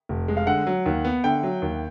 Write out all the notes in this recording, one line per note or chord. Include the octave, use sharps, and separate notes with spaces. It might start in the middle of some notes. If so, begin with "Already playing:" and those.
F1
G#3
F5
D3 F#5
F#3
D#2
B3
D3 G5
F#3
D#2